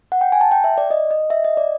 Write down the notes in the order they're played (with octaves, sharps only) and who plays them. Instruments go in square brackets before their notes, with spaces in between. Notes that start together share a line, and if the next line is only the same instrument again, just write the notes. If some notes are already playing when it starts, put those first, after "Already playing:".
[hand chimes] F#5
G5
G#5
A5
G5
E5
D5
D#5
D#5
E5
D#5
D5